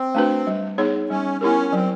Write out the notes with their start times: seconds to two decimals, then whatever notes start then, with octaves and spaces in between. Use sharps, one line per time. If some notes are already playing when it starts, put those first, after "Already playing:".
Already playing: C4
0.15 A3 D4 F#4 B4
0.47 G3
0.78 B3 D#4 G#4 C#5
1.10 G3 C#4
1.41 B3 C#4 E4 G4 A#4
1.73 F#3 C4